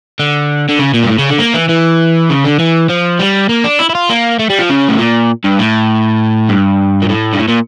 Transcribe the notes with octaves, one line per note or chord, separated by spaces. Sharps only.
D3
D3
C#3
A#2
G2
A2
C#3
D3
A#3
E3
E3
C#3
D3
E3
F3
G3
A#3
D4
E4
E4
F4
A#3
A3
G3
F3
C#3
A2
A#2
G2
A2
G2
A#2
A2
G2
A2
A#2